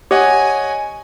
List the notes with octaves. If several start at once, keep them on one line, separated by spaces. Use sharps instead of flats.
G4 C#5 D#5 F#5 G#5